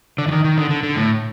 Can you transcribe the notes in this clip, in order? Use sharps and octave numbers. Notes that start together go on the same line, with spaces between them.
D3
E3
D#3
D#3
D3
D3
D3
A2